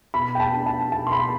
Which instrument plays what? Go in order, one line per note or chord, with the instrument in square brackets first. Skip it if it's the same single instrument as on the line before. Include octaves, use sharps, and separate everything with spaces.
[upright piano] B2 B5
G5
A5
D4
A5
B2 A5
C6
B5